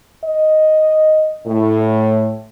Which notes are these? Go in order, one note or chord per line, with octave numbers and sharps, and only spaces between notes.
D#5
A2